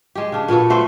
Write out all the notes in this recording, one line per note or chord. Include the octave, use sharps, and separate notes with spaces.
G#3 G4
C#3 D4
A#2 B3 F#4 A4
A3 F#4 B4 C5